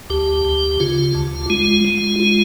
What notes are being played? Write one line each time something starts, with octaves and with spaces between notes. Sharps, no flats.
D2 G4
D2
C#3 F4
D2
G#3 F4
G#3
F4